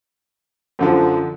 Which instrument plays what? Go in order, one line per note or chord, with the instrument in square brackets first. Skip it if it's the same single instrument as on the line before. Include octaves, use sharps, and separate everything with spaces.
[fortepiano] F#2 D3 F3